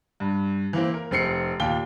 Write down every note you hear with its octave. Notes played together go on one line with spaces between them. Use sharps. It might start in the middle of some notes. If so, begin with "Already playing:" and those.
G2
E3 A#3 C4
A#4
F1 C4 C7 C#7
D#2 A#2 F4 G5 G7